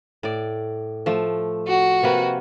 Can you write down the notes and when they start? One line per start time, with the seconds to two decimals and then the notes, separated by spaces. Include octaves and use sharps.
0.23 A2 D5
1.06 F3 A3
1.67 F#4
2.03 C3 A#3 B4